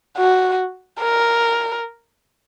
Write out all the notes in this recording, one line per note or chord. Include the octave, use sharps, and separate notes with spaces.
F#4
A#4